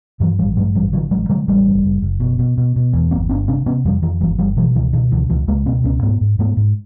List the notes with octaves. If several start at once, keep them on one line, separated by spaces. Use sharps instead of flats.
G2 E3 F#3
A1 F3 G3
G2 F#3 G#3
A1 F3 G3
D3 E3 F#3
A1 F#3 G#3
D3 F#3 G#3
A1 G3 A3
F#1
F#1
F#1
B2
B2
B2
B2
E2
G1 A#3 C4
G1 C4 D4
C3 C4 D4
C3 B3 C#4
F2 F3 G3
F2 D#3 F3
G1 E3 F#3
G1 F3 G3
B2 E3 F#3
C#2 D#3 F3
B2 D#3
C#2 D3 E3
C#2 D#3 F3
C#2 G#3 A#3
B2 A#3 C4
C#2 B3 C#4
G#2 A3 B3
G#2
G#2 A3 B3
G#2